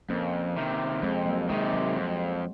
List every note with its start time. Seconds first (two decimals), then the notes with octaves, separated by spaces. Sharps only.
0.09 F2 A#3 C#4
0.57 C3 D#3
1.02 F2 G#3 C4
1.26 F#3 A#3
1.49 C3 D#3 G#3
1.73 F#3
1.97 F2